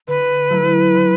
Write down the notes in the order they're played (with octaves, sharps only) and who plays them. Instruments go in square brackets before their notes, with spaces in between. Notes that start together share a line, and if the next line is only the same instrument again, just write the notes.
[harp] D3 [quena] B4
[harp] F#3 A3 E4
D3